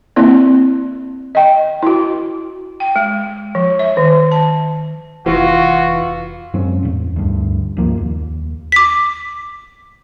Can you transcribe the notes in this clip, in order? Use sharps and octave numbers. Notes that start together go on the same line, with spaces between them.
A#3 C4 E4 D5
D#5 G5
E4 F#4
G5
G#3
F3
E5
D#3
A5
F1 E3 F4 F#4
F#2 G#3 C4 C#4
E2 A2
D2 G2
C#2 G2 F3 A#3
D#2
D6 B6